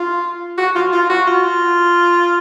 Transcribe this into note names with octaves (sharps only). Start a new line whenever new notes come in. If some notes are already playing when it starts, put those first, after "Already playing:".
Already playing: F4
F#4
F4
F4
F#4
F4